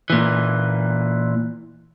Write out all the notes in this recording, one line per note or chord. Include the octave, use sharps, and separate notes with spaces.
A#2 E3